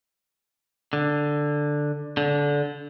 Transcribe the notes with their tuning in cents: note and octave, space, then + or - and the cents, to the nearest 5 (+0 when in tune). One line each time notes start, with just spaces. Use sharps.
D3 +5
D3 -20